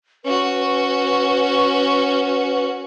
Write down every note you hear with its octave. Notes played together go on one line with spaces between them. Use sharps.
C#4 F#4 B4